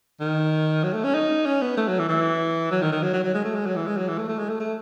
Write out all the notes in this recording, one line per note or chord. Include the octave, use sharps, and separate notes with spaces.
D#3
F#3
A3
C#4
D#4
C#4
B3
A3
F#3
E3
E3
F#3
D#3
D#3
F#3
F#3
F#3
G#3
A3
G#3
F#3
E3
G#3
F#3
E3
A3
A3
G#3
A3
A3